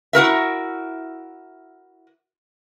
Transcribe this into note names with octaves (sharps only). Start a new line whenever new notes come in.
E4 F#4 A#4 E5